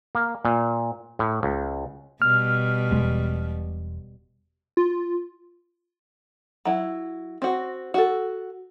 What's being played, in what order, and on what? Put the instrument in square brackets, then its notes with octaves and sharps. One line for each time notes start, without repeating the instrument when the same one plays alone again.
[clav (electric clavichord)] A#3
A#2
A2
C#2
[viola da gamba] B2 G3 [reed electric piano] F6
[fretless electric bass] E1 G#3
[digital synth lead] F4
[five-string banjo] F#3 E4
C4 F#4
F#4 A4